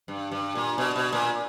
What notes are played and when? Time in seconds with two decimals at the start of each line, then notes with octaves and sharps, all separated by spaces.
0.08 G2
0.31 G2
0.55 A#2
0.78 B2
0.96 B2
1.12 A#2